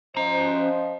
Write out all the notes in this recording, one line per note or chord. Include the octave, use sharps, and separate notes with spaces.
F3 C#4 C5 D#5 A#5